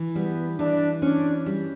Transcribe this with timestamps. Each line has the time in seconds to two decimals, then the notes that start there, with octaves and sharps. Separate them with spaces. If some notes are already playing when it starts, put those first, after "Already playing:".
Already playing: E3
0.15 G3 B3
0.59 E3 D4
1.02 C#4 D4
1.46 G3